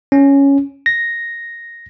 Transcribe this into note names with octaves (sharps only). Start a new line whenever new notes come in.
C#4
A#6